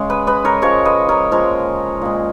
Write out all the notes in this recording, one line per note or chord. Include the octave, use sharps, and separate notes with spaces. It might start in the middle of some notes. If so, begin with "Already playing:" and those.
Already playing: C#3 G#3
G#4 B4
B4 D#5
A#4 C#5
C#3 F3 G#3 A#4 C#5
B4 D#5
A#4 C#5
A#2 F3 G#3 A#4 C#5
A#2 G#3